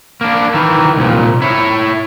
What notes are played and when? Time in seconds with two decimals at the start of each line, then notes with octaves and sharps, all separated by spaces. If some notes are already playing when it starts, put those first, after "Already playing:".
0.21 A#3 D4
0.54 D#3 E3
0.97 C2 A#2
1.42 E4 C#5